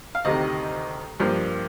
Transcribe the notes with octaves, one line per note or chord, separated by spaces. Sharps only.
F5
D2 C3 D#3 D#5
G2 F3 A#3